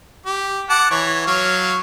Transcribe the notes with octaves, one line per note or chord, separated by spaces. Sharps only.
G4
F#5 A5 D6
E3 C#5
F#3 C#5 F5